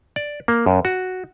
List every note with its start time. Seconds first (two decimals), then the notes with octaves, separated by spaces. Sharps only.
0.16 D5
0.48 A#3
0.66 F#2
0.85 F#4